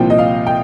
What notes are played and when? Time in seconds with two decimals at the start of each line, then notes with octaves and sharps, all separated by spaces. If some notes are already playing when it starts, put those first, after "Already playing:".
Already playing: C2 A#2 F3 C4 G5
0.10 D#5
0.18 F5
0.46 G5